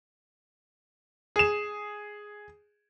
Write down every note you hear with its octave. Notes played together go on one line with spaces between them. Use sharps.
G#4 E7